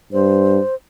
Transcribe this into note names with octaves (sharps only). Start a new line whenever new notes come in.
G2 C5